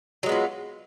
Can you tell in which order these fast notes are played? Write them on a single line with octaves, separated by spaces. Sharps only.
F#3 G#3 B3 F4